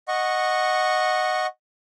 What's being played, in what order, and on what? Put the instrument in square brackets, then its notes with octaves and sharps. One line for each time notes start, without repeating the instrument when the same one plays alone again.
[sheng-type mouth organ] D#5 F#5 C#6